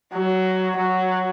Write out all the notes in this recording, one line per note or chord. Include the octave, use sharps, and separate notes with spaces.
F#3
F#3